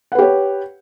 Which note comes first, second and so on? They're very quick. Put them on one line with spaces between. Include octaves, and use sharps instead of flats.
F#5 B4 G4 C#5